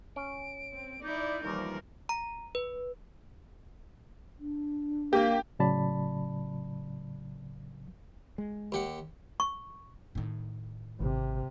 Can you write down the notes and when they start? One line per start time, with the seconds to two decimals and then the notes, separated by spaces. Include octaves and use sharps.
0.16 C#4 D7
0.72 C4
1.04 D#4 E4 D5 G6
1.45 D#2 E3 F3 G3 A#4 D5
2.09 A#5
2.55 B4
4.40 D4
5.13 A#3 G4
5.59 A2 C#3 F#3 D5 A5 B5
8.38 G#3
8.72 D#2 G4 F#5
9.40 C#6
10.15 A2 D#3
11.01 G#1 C3